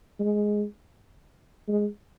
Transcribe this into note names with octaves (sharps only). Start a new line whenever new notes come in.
G#3
G#3